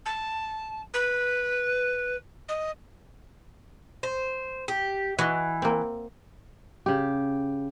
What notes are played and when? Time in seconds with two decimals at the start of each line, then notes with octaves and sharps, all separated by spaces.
0.05 A5
0.93 B4
2.48 D#5
4.03 C5
4.68 G4
5.19 E3 F#4 D#5
5.62 A#3 C4
6.86 C#3 G4